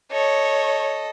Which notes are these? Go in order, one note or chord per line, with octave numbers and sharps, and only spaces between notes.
A4 C#5 D#5